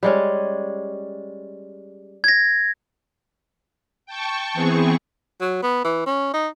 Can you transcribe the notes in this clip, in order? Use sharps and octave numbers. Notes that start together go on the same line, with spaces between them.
G3 G#3 C#4
G#6 A#6
G5 A5 C#6
E3 B3 C4 G#4 C#6
F#3
B3
E3
C#4
D#4